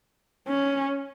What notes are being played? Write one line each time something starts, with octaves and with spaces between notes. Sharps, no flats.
C#4